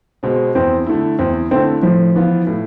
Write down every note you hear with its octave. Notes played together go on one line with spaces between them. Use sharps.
B2 G#3 C4
E2 C4
D3 A3 E4
E2 C4
D3 A3 C4 E4
A2 F3
E3 B3 F4
A2